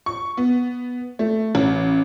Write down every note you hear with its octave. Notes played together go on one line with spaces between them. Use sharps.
C#6
B3
A3
A1